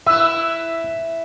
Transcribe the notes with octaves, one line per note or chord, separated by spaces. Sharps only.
E4 B4 E5